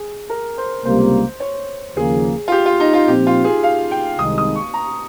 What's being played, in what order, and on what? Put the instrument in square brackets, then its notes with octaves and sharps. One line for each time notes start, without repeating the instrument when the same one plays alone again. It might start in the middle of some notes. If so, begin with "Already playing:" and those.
Already playing: [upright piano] G#4
A#4
C5
[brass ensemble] C#2 C3 G3 A#3 [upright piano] C5
[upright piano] C#5
[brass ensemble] D#2 C#3 F3 A#3 [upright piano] G#4
[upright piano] F4
G4
F4
D#4
F4
[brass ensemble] A#2 F3 C4 [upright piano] G4
[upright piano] F4
G#4
F5
G5
[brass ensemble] C2 C3 D#3 G#3 D#4 [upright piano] D#6
[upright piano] D#6
C#6
A#5